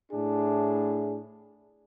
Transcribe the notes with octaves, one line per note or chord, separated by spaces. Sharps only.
A2 D4 E4 G#4